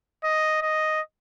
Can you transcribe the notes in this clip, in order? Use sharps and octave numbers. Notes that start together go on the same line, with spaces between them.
D#5
D#5